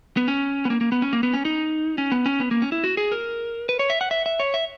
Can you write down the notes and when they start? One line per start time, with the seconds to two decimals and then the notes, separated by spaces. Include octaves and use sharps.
0.17 B3
0.28 C#4
0.65 B3
0.70 A#3
0.81 A#3
0.92 B3
1.02 C#4
1.13 A#3
1.23 B3
1.33 C#4
1.45 D#4
1.98 C#4
2.12 B3
2.26 C#4
2.40 B3
2.51 A#3
2.62 C#4
2.72 E4
2.84 F#4
2.97 G#4
3.12 A#4
3.69 B4
3.79 C#5
3.90 E5
4.01 F#5
4.11 E5
4.26 E5
4.40 C#5
4.54 E5